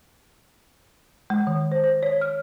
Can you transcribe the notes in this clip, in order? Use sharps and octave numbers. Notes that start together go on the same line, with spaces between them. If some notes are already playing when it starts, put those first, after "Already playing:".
G#3
D#3
C5
C5
C#5
F6